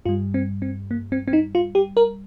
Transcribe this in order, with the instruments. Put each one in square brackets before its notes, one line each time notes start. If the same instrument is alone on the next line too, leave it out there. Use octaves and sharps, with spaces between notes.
[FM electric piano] G2 G3 F4
C4
C4
A#3
C4
C4
D#4
F4
G4
A#4